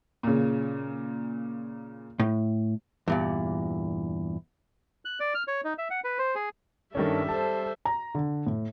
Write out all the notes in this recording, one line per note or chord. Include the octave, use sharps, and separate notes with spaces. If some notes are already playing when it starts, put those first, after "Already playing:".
A#2 C#3
A2
E2 G2 A#2
F#6
D5
F6
C#5
D#4
E5
F#5
B4
C5
G#4
G2 D#3 G3 C#4 A4 E5
A4 C5 A5
A#5
D3
A2